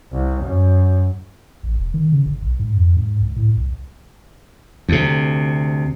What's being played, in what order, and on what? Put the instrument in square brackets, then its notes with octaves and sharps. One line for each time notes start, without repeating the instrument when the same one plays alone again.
[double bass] C2
F#2
[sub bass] A1
E1
D#3
C#3
G1
B1
G#2
F2
G#2
C#2
A2
C2
[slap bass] D2 C3